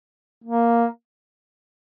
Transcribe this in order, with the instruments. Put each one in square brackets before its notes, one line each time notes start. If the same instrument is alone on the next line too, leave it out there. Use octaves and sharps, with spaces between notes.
[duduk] A#3